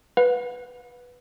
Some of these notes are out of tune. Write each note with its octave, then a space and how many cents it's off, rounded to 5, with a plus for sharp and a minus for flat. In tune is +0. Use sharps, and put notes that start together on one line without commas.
B4 +0 F#5 -45